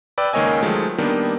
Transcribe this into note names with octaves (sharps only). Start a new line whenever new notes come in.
B4 D5 G5 E6
C#2 D#3 A#3 C#5 D#5 G#5
D#3 F3 F#3 G#3 A3
D#3 G3 A#3 B3 D4